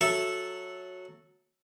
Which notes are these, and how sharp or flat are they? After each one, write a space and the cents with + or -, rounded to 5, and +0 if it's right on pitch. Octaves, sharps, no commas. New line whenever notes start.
F#3 -10 A4 -5 E5 +0